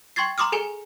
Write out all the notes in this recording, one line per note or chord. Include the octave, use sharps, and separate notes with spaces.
G5 C6 C#6 G#6 A6 C7
A#5 C6 D6 D#6 F6
G#4 A4 G#5 C#7 G7